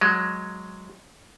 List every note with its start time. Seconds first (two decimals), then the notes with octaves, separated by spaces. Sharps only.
0.01 F#3 G#3